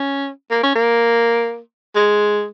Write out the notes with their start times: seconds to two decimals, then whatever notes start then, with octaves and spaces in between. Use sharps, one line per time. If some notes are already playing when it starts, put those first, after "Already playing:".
Already playing: C#4
0.51 A#3
0.63 C#4
0.75 A#3
1.95 G#3